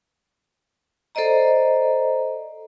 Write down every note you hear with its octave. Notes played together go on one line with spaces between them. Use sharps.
A4 C5 D5 D#5 A#5